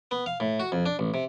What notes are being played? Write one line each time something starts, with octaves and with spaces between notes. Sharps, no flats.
B3
F5
A2
F#4
F2
D4
A1
C3